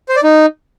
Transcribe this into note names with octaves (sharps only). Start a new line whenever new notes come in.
C5
D5
D#4